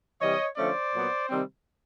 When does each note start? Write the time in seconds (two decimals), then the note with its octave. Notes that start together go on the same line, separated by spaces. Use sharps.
0.21 C3 E3 G3 C#5 D#5
0.57 D3 F3 A3 C#4 C5 D5
0.94 A#2 F#3 B3
1.29 C3 D#3 G3 C4